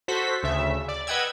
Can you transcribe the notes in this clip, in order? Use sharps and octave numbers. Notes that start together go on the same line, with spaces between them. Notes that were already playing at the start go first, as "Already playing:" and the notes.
F#4 A4 C5 B6
D2 C#3 E5
D5
B4 D#5 F#5 G5 E6 G#6